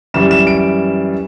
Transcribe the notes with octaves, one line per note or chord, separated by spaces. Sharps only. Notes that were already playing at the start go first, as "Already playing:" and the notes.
F#2 E3 G3 E7
E7
D7